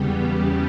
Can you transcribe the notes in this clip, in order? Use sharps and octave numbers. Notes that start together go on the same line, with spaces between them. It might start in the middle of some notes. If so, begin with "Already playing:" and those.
Already playing: E2 C#3 G3 B3 G4